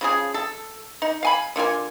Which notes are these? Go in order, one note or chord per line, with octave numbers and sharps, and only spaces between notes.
C#3 F3 G#4
A4
D#4
F5 G#5 B5
D3 A#3 F4 G#5